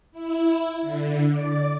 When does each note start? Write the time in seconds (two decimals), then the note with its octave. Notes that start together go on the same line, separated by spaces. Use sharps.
0.12 E4
0.82 D3
1.30 D5